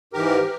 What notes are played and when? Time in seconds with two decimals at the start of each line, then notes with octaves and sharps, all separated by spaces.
0.13 G#2 E3 G4 A#4
0.41 E3